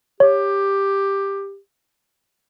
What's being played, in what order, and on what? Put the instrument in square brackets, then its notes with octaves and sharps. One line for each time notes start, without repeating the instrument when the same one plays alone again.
[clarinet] G4 [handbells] C#5